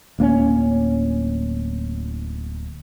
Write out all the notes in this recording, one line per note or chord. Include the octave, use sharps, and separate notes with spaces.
D1 A#3 C4 C#4